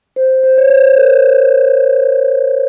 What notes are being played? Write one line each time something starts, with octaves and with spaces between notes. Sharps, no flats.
C5
C5
C#5
C5
A#4